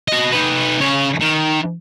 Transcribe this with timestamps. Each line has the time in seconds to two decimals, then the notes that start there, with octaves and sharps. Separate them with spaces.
0.08 F#4 D#5
0.32 D#4 B4
0.80 C#3 C#5
1.21 D#3